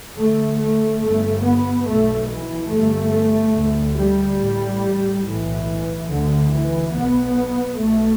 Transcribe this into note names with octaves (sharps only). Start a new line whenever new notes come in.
D2 A3
A3
G1 G2 A3
B3
B1 B2 A3
E3
G1 G2 A3
D2
G3
A1 A2
B1 A2 E3
D2 D3
E3
B1 B2 B3
B1 B2 A3